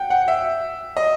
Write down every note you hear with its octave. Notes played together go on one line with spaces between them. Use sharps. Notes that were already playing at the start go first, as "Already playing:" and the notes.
Already playing: F#5 G5
F#5
E5
D#5